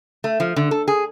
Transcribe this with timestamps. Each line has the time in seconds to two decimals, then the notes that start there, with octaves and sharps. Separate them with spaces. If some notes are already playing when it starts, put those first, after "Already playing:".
0.24 A3
0.40 F3
0.56 D3
0.71 A4
0.88 G#4